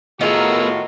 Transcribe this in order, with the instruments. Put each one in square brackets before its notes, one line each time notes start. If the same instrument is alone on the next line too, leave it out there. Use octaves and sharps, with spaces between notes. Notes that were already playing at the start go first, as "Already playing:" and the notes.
[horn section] A2 F4 F#4 [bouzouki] D#3 [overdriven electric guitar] B3 A#4 [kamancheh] G#4 E6